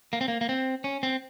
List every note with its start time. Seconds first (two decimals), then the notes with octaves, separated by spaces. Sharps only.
0.13 A#3
0.21 C4
0.28 A#3
0.41 A#3
0.49 C4
0.84 C#4
1.03 C4